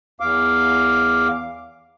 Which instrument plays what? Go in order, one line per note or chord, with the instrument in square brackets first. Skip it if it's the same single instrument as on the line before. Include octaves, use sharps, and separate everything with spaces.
[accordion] E2 F5 D6